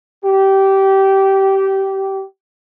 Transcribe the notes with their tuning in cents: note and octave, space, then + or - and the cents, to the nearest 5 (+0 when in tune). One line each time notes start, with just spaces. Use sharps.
G4 -20